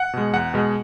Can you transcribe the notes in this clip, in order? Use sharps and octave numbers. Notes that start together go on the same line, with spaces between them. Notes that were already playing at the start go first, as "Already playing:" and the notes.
Already playing: F#5
B2 G#3
E2 F#5
B2 G#3